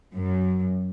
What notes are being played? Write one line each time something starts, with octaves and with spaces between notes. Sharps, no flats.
F#2